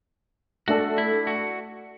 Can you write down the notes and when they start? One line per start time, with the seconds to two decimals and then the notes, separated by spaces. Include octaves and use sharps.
0.68 A3 D4 F#4 A4
0.98 E4
1.27 F#4